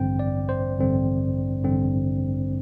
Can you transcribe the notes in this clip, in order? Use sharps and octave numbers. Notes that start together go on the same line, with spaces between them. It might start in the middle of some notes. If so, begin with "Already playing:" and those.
Already playing: A1 G2 D3 C4 G5
D5
C5
A1 G2 D3 C4
A1 G2 D3 C4